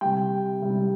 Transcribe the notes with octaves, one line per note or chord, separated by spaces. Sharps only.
C3 G3 G5
C3 G3